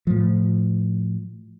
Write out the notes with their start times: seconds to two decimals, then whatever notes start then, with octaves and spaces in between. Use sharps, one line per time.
0.07 A2 F3